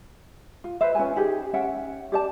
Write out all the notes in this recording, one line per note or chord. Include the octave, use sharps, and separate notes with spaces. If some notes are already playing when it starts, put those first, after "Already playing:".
F4
B4 C5 E5
C#4 F4 B4 G#5
D#4 G4 G#4
C#4 E5 F#5 G5
G4 D5 A5